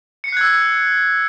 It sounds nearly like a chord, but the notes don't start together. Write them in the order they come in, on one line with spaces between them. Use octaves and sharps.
C#7 C7 F#6 G#6 E6